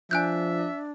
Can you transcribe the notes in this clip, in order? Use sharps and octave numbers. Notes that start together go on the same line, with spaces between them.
F3 D4 E5 G#5 F#6 G6